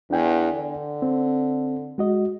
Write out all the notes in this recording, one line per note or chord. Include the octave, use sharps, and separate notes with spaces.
E2 D4 G5 G#5
D3
C4
G#3 F#4 D#5